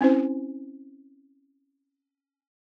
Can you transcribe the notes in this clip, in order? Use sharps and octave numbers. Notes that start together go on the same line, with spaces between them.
C4 C#4 E4 C5